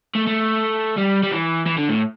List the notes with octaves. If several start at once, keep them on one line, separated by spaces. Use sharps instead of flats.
A3
A3
G3
G3
E3
E3
D3
A2